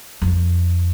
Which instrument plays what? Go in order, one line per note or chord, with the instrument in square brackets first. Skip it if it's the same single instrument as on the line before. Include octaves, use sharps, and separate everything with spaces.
[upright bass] F2